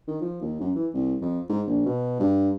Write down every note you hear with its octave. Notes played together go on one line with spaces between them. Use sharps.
D#3
F3
D#2
F#2
E3
C2
F2
G#2
A#1
B2
G2